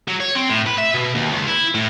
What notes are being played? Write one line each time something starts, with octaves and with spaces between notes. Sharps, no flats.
F#3
C#5
C4
A2
B4
E5
B2
D#2
C#2
E4
A2